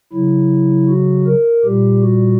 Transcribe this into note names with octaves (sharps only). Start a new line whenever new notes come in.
C#3 F#3 E4
F#4
A#4
A#2 G3 G4
F#4